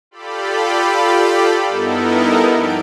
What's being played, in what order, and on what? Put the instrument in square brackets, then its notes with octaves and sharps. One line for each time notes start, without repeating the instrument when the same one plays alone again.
[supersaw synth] F4 G4 A4 D5 B5
G2 B3 D#4 E4 A4 A#4
F3 G3 D5 G6 D7